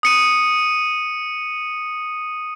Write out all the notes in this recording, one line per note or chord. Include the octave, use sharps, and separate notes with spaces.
D#6 C#7 D#7